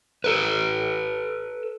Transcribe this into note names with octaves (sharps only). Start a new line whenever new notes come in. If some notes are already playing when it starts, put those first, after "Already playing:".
A4 B4